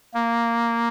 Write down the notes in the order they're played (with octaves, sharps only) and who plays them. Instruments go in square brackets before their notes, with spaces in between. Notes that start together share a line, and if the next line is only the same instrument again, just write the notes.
[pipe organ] A#3